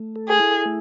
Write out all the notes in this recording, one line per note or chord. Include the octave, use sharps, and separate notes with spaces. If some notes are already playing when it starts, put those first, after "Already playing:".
Already playing: A3
A4
G#4
E4
A3